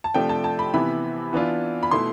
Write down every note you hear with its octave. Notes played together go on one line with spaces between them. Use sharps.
A5
C3 F3 A3 D4 G5
A5
A5
B5
C3 E3 B3 E4 B5
E3 B3 D4 F4
B5
B2 A3 E4 C6